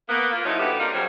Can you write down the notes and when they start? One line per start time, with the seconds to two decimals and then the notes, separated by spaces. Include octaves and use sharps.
0.09 A#3 B3
0.32 A#3 F4
0.45 F3 F#3 A3 C#4 D#4 E4
0.59 D3 A#3 B3 F#4 G4 B4
0.79 A#3 C4 D4 D#4 F4 A#4
0.92 C#3 F#3 G3 C4 F4 C#5